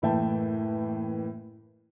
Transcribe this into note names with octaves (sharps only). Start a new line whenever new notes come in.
F#1 A2 E3 E5 G5 A5